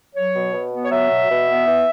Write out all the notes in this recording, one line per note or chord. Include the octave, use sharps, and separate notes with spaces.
F#3 C#5
B2
B2
B3
C#5
F#3 E5
B2
B2
B3
E3